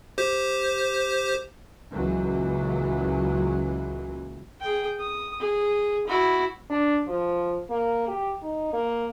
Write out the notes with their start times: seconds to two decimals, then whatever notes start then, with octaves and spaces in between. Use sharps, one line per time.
0.18 G4 C5
1.91 C#2 A#2 E3 F#3
4.61 G#4 G5
4.99 D#6
5.40 G#4
6.08 E4 F#4
6.70 D4
7.07 F3
7.70 A#3
8.08 G4
8.43 D#4
8.73 A#3